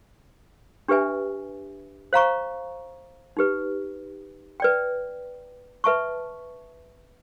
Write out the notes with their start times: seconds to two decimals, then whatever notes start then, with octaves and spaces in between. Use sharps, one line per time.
0.88 D4 G4 B4 E5 G#5
2.13 C5 F5 A#5 C#6
3.37 D#4 G4 B4
4.60 B4 D5 G5
5.84 B4 E5 A5 C#6